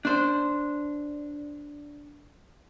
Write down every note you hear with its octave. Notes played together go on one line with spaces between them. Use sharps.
D4 C5